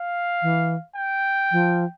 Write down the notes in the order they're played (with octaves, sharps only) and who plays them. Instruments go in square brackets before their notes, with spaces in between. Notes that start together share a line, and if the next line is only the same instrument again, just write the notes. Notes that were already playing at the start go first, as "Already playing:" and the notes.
Already playing: [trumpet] F5
[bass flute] E3
[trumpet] G5
[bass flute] F3